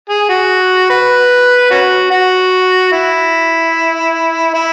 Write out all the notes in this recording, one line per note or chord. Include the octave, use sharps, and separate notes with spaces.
G#4
F#4
B4
C#4 F#4
F#4
E4
E4